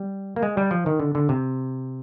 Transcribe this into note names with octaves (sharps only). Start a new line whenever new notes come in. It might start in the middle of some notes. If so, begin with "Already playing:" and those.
Already playing: G3
A#3
G#3
G3
F3
D#3
D3
D3
C3